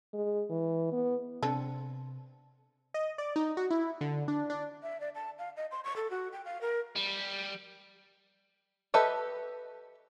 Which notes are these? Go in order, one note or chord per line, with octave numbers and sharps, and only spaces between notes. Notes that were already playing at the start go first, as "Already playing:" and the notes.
G#3
E3
B3
C3 C4 D4 A4
D#5
D5
D#4
F#4
E4
D3
D4
D4
E5
D5
A5
F5
D#5
C6
C#6
A4
F#4
G5
F5
A#4
G3
G4 A4 B4 D#5 E5